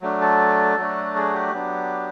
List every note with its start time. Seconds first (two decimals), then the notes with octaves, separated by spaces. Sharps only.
0.02 F#3 A3 D4
0.21 A4
0.77 F#3 A3 D4 F#4
1.16 G#4
1.34 G4
1.53 F#3 B3 D4